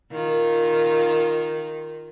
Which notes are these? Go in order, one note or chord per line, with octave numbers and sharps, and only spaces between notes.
D#3 F4